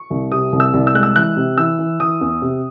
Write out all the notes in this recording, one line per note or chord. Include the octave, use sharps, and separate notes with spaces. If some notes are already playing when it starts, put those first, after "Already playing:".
Already playing: C#6
C2
C3 D#6
C2
E6
C2
E6
G#3 F#6
E6
E3 F#6
C3
E3 E6
E3
E3 D#6
E2
C3